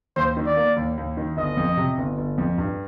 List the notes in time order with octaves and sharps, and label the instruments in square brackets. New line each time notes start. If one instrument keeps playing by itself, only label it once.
[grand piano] D#2 [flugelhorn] C5
[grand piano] D#3
[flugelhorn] D5
[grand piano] A#3
D#2
D#2
D#3
[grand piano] G1 [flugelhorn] D#5
[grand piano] F2
C3
G1
G1
F2
G2